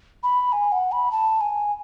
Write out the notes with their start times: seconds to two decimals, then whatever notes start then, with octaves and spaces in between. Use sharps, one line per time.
0.23 B5
0.52 G#5
0.72 F#5
0.92 B5
1.12 A5
1.41 G#5